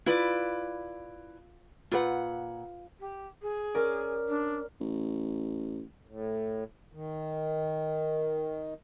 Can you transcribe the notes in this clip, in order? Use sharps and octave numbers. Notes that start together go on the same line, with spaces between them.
E4 F4 B4 D5
A#2 F4 B4 F#5
G4
G#4
C#4 A#4 D5
D4
A1
A2
D#3